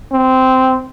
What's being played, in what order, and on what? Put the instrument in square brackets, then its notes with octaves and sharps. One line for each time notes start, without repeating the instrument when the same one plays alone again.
[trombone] C4